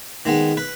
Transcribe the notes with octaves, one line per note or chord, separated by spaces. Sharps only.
D#3 G#3 B3
B4